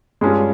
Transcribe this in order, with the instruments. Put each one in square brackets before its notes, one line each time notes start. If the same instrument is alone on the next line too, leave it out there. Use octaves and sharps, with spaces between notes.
[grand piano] G2 G3 C#4 F4 G#4 [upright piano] G#3